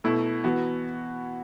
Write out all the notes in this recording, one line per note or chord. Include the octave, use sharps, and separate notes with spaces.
B2 A3 E4
E3 B3 F#4